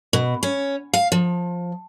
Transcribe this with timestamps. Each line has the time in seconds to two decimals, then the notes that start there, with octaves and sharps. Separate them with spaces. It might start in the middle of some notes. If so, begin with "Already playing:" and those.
0.13 B2
0.43 C#4
0.93 F5
1.12 F3